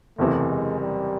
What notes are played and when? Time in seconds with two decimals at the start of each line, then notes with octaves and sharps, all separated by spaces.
0.18 F#1 E2 C3 E3 A3
0.50 G#3
0.81 G3